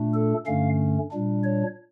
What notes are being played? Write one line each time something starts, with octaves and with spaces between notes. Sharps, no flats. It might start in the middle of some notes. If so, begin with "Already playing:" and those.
Already playing: A#2 A3 D4
A4
G2 D3 A3 C#4 F5
A#2 G3 D4
C#5